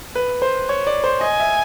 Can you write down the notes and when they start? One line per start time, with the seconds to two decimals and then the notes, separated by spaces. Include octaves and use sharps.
0.15 B4
0.42 C5
0.69 C#5
0.87 D5
1.04 C5
1.21 D#5 G#5
1.40 E5